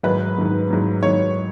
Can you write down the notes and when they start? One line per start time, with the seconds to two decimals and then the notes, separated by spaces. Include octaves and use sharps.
0.03 G#2 D#3 F#3 B4
0.38 G#2 D#3 F#3
0.70 G#2 D#3 F#3
1.03 G#2 D#3 F#3 C#5